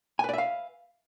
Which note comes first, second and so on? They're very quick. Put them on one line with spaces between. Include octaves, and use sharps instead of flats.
G#5 B4 D5 E5 F5